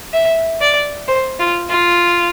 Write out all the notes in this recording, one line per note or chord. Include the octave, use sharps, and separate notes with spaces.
E5
D5
C5
F4
F4